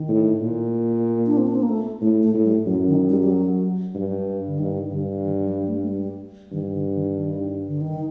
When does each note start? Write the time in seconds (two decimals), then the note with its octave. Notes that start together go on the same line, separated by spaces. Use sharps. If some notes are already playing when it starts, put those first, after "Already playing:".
Already playing: D#3
0.09 A2
0.41 A#2
1.26 D4
1.37 C4
1.48 D4
1.55 C4
1.63 A#3
1.69 A3
2.01 A2 A3
2.23 A3
2.34 A2
2.45 G3
2.66 F#2 F#3
2.88 D#3
3.09 G3
3.22 G3
3.30 F#3
3.95 G2
4.47 D3
4.59 G2 D#3
4.91 G2 D3
5.23 D#3
5.46 F#3
5.67 A3
5.83 A3
5.88 G3
6.52 G2 D#3
6.74 D3
6.95 D#3
7.17 D#3
7.67 D3
7.81 D#3